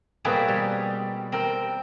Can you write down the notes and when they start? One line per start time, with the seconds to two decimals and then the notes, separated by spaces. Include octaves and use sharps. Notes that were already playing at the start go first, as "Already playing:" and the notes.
0.25 B2 G3 A#3 C4 G#4 B4
0.48 G3
1.32 C4 A#4 G5